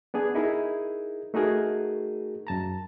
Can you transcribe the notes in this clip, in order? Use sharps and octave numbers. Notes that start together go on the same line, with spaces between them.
B3 D4 G#4
D#4 E4 G#4 A#4
A3 D#4 F#4 G#4 A#4
F#2 A5 A#5